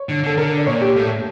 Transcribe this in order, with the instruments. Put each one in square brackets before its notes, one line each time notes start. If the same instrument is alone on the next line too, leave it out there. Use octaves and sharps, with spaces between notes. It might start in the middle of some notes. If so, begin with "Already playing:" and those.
Already playing: [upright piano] C#5
[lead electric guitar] D3
[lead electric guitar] D3 [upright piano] A4
[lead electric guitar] D3 [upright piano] A#4
[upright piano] D5
[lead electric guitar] A#2 [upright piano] C#5
[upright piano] G4
[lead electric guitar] A2 [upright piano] A4